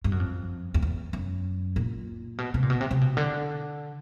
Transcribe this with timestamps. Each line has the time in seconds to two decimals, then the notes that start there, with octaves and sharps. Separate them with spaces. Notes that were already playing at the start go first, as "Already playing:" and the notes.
0.04 G2
0.12 F#2
0.20 F2
0.74 F2
0.82 E2
1.13 F#2
1.76 A#2
2.38 B2
2.54 C3
2.63 A#2
2.70 B2
2.81 C3
2.91 C3
3.01 B2
3.17 D3